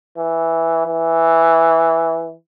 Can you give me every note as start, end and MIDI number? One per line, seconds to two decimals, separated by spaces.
0.18 0.83 52
0.87 2.33 52